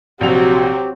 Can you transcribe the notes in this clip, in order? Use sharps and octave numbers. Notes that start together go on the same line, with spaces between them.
A#1 C3 F#3 C4 F#4 G4 F7